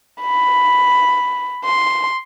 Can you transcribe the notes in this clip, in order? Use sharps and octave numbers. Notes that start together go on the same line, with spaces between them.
B5
C6